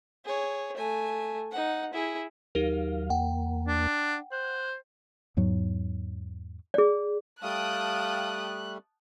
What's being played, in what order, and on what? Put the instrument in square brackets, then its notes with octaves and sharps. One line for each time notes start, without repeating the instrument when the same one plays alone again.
[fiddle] G#4 C#5
A3 G#5
D#4 F#5
E4 G#4
[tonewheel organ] D#2 F#3 F5 [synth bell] D#4 G4 A#4
[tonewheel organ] E2 A#3 [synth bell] F#5 G5
[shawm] D4
[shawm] C5 [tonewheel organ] F#6
[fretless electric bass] E2 G#2 F#3
[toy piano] G#4 D5
[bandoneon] G3 A3 [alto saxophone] F5 [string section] G5 A5 D#6 [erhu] F#6